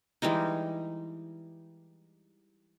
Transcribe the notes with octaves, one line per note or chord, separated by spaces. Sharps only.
E3 G3 G#3 D#4